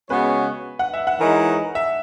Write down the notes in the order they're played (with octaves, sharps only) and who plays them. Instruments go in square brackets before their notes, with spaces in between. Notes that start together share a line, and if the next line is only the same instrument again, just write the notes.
[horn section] C#3 G#3 B3 F#4 C#5 [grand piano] B4
[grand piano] F#5
E5
F#5
[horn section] E3 G#3 D#4 A#4 C#5
[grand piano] E5